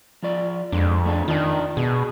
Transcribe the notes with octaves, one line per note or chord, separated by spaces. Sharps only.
F3 F4 D5
F2 G#2 G#3 D4
A3 D4 G#4
D#3 D4 F4
B2 G#4